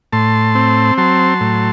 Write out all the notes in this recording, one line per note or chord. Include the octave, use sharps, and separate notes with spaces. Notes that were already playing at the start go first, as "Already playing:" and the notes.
A2 A5 C6
C4
F#3 A5 C6
A2